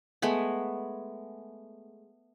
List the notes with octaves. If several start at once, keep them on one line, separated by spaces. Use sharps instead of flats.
G#3 A3 B3